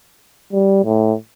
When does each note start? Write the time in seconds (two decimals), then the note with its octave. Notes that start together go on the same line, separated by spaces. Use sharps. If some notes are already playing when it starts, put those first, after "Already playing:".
0.53 G3
0.84 A2